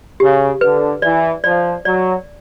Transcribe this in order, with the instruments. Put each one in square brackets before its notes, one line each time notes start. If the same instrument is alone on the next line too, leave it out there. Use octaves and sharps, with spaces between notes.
[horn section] C#3 [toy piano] G4
[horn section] D3 [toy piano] B4
[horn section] E3 [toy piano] D5
[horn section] F3 [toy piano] D5
[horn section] F#3 [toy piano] D5